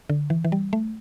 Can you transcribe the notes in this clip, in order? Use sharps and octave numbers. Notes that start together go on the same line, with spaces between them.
D3
E3
E3
G3
A3